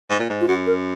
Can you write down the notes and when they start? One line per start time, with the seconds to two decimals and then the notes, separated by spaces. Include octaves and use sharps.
0.10 G#2
0.19 A#2
0.29 G#2
0.41 F4
0.48 F#2 F#4
0.67 A#4